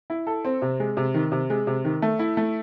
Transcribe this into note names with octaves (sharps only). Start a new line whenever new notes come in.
E4
A4
C4
C3
G#3
C3
D#3
C3
G#3
C3
D#3
A3
E4
A3